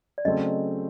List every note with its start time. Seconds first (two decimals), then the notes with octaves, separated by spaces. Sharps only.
0.18 D5
0.25 C#3 F#3 A3 C4 D#5